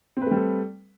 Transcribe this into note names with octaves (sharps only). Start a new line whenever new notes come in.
G3 A3 C4 A4 B4